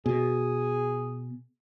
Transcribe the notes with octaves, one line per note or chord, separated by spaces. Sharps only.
B2 G#4